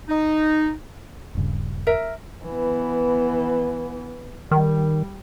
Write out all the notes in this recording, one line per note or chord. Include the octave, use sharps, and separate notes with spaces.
D#4
D#1 G2 C#3
A#4 E5
E3 B3
D#3 G3